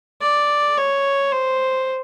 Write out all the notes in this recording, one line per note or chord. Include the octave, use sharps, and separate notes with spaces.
D5
C#5
C5